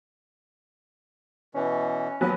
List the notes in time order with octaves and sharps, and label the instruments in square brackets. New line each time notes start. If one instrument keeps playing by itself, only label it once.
[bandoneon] B2 E3 [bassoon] C#4
[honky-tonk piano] D#2 F#3 B3 [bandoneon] G#2 B4